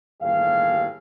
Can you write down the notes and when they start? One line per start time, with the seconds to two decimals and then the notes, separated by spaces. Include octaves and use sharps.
0.21 G1 D#2 A2 G#4 F5